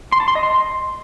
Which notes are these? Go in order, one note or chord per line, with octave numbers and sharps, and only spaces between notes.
C6
A5
C6
D#5
C6